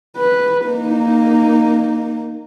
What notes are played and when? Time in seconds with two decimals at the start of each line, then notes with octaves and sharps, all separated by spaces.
0.17 B4
0.66 A#3 D#4